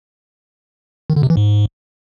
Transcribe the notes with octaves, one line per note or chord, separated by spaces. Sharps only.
D#3
D3
C3
E3
G#2